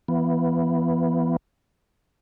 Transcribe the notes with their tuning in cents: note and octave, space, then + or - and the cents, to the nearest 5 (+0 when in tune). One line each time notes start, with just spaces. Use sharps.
E3 +30 B3 +0